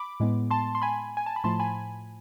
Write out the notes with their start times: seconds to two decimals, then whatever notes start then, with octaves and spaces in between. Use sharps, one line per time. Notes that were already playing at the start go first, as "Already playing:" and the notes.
Already playing: B5 D6
0.20 A2 G#3 B3
0.51 A5 C6
0.75 C6
0.82 G#5 B5
1.17 G#5
1.26 A5
1.36 B5
1.44 A2 F3 A3 A5 C6
1.60 G#5 B5